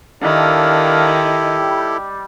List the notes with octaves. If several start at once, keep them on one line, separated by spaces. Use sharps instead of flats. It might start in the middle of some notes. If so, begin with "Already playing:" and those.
D#3 D4 E4 G4 A4 A#4 F5
G3